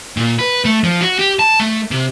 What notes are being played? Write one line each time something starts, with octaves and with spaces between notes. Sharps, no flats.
A#2
B4
A3
F3
F#4
G4
A5
A3
C3